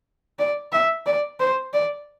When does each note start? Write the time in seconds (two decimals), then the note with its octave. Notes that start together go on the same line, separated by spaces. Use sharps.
0.39 D5
0.72 E5
1.06 D5
1.40 C5
1.73 D5